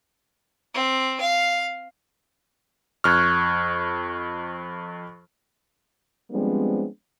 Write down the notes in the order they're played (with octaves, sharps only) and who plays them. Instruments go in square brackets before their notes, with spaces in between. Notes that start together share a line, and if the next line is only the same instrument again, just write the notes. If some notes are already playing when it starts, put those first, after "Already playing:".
[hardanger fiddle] C4
F5
[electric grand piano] F2 F6 [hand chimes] C#6 F#6 G#6
[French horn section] F3 G3 G#3 B3 C4 D4